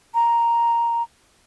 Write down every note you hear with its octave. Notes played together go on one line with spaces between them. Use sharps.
A#5